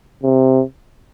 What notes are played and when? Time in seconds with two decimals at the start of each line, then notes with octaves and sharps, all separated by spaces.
0.23 C3